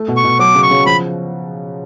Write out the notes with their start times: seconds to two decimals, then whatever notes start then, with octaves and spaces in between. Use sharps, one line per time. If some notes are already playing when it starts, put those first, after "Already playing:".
Already playing: A3
0.08 B2
0.17 C#6
0.24 B2
0.39 F#3 D6
0.55 C#3
0.63 C#6
0.71 C#3
0.86 F3 B5